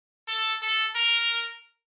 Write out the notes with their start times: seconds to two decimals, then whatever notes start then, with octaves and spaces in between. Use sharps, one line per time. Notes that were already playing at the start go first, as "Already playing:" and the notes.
0.28 A4
0.62 A4
0.95 A#4